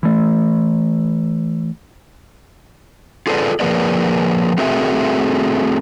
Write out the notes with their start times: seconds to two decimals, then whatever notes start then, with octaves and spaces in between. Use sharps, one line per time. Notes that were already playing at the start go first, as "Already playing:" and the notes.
0.03 E3 A3
3.27 F4 G#4 A4 B4 C#5 D5
3.60 F3 A#3 G#4 A#4 B4 D5
4.58 A3 C4 F#4 G#4 A#4 E5